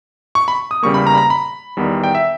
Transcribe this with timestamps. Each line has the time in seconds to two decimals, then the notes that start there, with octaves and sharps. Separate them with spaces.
0.35 C#6
0.48 B5
0.71 D#6
0.83 E2 C#3 G3 A#3 C#6
0.94 B5
1.07 A#5
1.15 B5
1.18 A#5
1.30 B5
1.77 E2 D#3 G3 B3
2.04 G5
2.15 E5